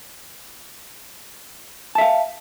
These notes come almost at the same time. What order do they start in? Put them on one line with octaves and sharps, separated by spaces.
A5 E5 F5